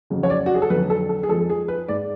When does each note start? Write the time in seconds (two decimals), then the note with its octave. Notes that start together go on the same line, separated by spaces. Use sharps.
0.10 F2 C#3 F#3
0.23 C#5
0.30 D5
0.46 F#4
0.54 G#4
0.62 A4
0.70 F2 D3 F#3 B4
0.90 A4
1.09 A4
1.23 G#4
1.29 F2 F3 G#3 A4
1.49 G#4
1.68 B4
1.88 G#2 G#3 D5